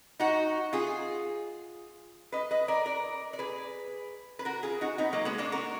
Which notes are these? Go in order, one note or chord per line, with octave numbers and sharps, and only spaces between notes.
D#4 F#4
F4 G#4
B4 D#5
B4 D#5
A#4 D5
A#4 D5
D5
G#4 B4
B4
F#4 A#4
F4 G#4
D#4 F#4
B3 D#4
F#3 A#3
G#3 B3
A#3 D4
F#4 A#4